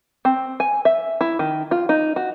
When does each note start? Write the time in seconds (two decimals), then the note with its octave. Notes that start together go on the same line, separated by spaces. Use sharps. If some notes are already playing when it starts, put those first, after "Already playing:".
0.25 C4
0.60 G#5
0.85 E5
1.21 E4
1.39 D#3
1.71 F4
1.89 D#4
2.16 F#4